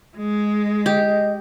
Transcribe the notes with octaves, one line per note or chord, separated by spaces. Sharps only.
G#3
G4 D#5